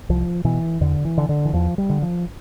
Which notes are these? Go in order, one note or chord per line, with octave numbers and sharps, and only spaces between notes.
C2 F3
B2 E3
E2 D3
E3
D3
D3
E3
E2 F3
G3
D3
F3